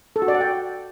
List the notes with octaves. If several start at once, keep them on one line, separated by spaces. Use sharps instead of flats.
A4
F#4
D5
F#5
G5